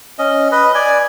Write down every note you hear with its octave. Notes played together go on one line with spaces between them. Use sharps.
C#4 D#5
B4 D#5
D5 G#5